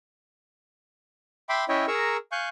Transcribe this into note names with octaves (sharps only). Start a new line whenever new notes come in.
E5 G5 B5 C6 D6
C#4 E4 C#5 D#5 E5 G5
G#4 A#4 A#5 C#6 E6
F5 G#5 C#6 F#6 G6